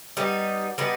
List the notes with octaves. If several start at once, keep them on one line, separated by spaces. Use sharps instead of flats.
G3 B3 D#4
G3 B3 D#4